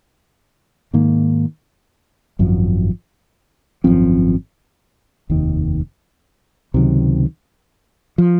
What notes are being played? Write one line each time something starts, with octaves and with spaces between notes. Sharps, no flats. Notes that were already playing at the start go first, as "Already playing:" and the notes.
G#2 D#3 A#3
G#1 F#2 F3
G#1 F#2 F3 C4
F1 D#2 D#3
C#2 C3 D#3 F#3
F3